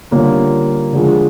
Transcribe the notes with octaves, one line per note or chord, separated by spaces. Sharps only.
D3 G3 A#3 C#4 F4
D3 F3 G#3